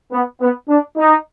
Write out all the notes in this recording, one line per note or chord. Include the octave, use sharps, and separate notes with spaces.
B3
B3
D4
D#4